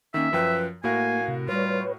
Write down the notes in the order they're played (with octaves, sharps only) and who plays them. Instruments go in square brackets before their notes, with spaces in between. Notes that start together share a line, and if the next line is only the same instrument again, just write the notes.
[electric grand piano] D#3 A#3 [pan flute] C#4 [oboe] E5
[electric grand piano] F#2 F3 G5 [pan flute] B4
[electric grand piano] A2 F#4 A#4 [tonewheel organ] A#3 [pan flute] F5 [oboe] G#5
[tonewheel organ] C3
[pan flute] G3 [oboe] F4 [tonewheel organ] B4 C#5